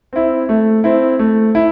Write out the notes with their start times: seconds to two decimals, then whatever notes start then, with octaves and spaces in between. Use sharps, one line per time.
0.13 C4 E4
0.49 A3
0.84 C4 E4
1.19 A3
1.55 E4